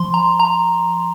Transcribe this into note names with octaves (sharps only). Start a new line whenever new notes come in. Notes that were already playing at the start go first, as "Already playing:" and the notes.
Already playing: F3 C6
A#5
A#5